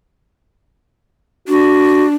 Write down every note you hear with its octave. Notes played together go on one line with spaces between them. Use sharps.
D4 F#4